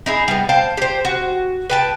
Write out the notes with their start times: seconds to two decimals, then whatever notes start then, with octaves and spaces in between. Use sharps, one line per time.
0.06 D#4 E4 G#4
0.28 G3 B3
0.49 C5 F5 G5 A5
0.77 G4 C5
1.05 F#4
1.70 B4 G5 A5